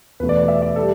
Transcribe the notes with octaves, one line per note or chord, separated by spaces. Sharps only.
E2 B2 A3 B4
D5
D5
E5
D5
G3 A4